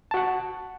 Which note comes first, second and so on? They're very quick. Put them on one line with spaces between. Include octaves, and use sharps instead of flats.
A5 F#4 F#5